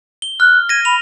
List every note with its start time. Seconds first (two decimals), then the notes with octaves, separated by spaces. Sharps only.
0.22 G7
0.40 F6 F#6
0.69 G#6 A#6 D#7
0.85 B5 F7